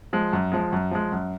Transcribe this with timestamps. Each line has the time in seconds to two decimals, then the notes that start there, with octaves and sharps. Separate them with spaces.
0.13 F3 G#3
0.33 F#2
0.52 F3 G#3
0.73 F#2
0.91 F3 G#3
1.12 F#2